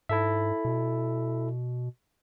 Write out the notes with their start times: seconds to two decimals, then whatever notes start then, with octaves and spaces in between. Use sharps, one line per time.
0.09 G#2 E4 A4 E5
0.65 B2